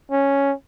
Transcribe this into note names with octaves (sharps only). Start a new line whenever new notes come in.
C#4